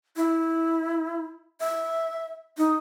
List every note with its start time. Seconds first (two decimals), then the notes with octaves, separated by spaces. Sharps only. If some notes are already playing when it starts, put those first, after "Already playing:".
0.16 E4
1.60 E5
2.58 D#4